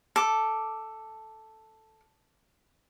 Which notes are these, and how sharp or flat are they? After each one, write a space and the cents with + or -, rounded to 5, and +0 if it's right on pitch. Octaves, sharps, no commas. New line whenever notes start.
A4 +0 D6 +0